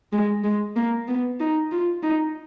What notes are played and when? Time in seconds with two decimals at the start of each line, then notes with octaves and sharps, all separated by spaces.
0.13 G#3
0.44 G#3
0.76 A#3
1.08 B3
1.40 D#4
1.72 F4
2.03 D#4